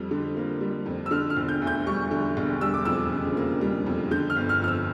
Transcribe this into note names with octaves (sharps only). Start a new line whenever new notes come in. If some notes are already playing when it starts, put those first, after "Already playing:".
Already playing: F2 G3
D3
A#3
G3
F2
E6
D3 F6
F6
E1
G6
D2
G6
G3 C#6
D3
E1
G3 E6
D6
F2 E6
C#3
A#3
G3
F2
D3 G6
F6
G1
F6
F2 F6
E6